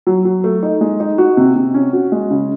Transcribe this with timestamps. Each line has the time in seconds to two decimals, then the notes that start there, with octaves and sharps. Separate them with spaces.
0.07 F#3
0.25 F#3
0.44 A3
0.63 D#4
0.81 G#3
1.00 D#4
1.18 F#4
1.37 C3
1.56 C3
1.74 C#4
1.93 F#4
2.12 G#3
2.30 C#3